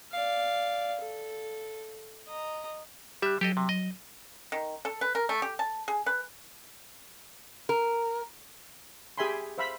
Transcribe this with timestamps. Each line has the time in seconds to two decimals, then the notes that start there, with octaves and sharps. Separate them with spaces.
0.12 D5 F5
1.00 A4
2.28 D#5 A#5
3.22 G3 G4 E5 F#6
3.41 F#3 G4 A4 D#5
3.57 C3
3.69 D#5
4.52 D#3
4.85 A4
5.01 B4
5.15 A#4
5.29 A3
5.42 G4
5.59 A5
5.88 G#4
6.06 B4
7.69 A#4
9.18 G4 G#4 E5 G#5 B5 C6
9.58 C5 E5 F5 B5